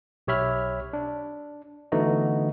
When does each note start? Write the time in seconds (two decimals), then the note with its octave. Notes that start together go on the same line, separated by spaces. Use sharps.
0.27 B1 G4 C#5 E5 B5 F6
0.93 D4
1.92 D3 E3 A3 B3 D#4 F#4